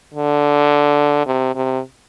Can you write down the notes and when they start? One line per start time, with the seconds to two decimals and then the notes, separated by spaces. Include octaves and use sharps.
0.14 D3
1.26 C3
1.55 C3